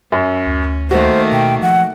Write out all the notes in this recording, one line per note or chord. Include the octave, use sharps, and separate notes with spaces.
F#2 C#4
D2
D#3 A3 A#3 F#4 C5
B2 G5
F3 F#5